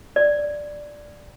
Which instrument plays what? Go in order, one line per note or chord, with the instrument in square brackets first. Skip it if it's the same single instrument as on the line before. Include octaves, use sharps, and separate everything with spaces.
[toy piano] D5